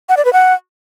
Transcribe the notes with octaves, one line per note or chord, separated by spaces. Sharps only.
F#5
D5
B4
F#5